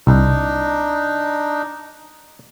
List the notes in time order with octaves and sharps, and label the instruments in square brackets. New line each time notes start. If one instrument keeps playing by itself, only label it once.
[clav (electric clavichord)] C2 [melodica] D4 D#4